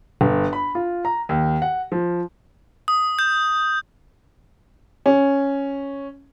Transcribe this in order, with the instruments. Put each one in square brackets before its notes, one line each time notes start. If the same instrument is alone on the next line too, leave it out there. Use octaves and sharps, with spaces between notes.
[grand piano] G1
B5
F4
A#5
D#2
F#5
F3
[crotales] D#6
G6
[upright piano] C#4